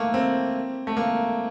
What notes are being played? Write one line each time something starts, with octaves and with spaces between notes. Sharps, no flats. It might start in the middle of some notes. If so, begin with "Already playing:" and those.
Already playing: A3 A#3
C4
A3
A#3